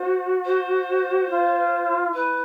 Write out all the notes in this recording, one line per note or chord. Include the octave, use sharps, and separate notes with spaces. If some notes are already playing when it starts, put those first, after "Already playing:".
Already playing: F#4 C5
C5
F4
E4 B4